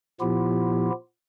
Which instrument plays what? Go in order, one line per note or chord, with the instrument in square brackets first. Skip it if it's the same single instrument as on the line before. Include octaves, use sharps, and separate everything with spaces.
[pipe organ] A#2 F3 B3 E4 F4 G4